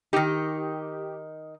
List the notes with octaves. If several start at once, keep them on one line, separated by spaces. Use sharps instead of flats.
D#3 D#4 G4